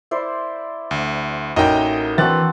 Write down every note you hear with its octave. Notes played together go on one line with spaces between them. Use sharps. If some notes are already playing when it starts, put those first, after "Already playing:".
E4 C5 D5
D2
A1 D#4 E4 F#4 A#4 D#5 G5
E3 C4 D4 F#4 F#6 A6